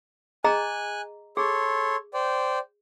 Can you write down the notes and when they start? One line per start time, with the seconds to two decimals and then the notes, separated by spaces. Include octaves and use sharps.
0.44 G#4 D#5 G#5 A#5 F#6
1.37 G#4 A4 C#5 C6
2.14 C5 D5 G5